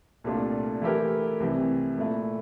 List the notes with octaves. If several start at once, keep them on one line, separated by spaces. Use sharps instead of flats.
C2 A#2 A3 D4 F4
E3 A3 E4 G4 A#4
C2 C3 E3 A3
A#2 A3 E4